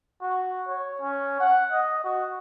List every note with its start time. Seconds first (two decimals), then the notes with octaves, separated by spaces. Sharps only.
0.22 F#4
0.68 C#5
1.01 C#4
1.40 F#5
1.72 D#5
2.04 F#4